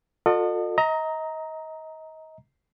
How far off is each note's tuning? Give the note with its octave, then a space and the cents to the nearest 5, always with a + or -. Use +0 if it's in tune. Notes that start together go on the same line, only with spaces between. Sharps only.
F4 +45 A4 +25 D#5 -35
D#5 +30 A#5 +0